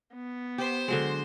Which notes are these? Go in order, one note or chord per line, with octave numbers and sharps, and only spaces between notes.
B3
G4 C5
D3 F#3 G#3